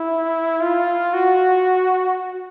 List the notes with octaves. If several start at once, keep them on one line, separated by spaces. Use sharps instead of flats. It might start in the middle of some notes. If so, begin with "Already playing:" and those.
Already playing: E4
F4
F#4